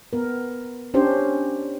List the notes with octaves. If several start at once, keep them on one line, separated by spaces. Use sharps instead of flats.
B3 A#4
C#4 D4 G4 C5